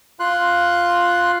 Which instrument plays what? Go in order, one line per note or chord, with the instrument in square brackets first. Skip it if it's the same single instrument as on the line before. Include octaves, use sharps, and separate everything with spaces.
[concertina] F4 C6 F#6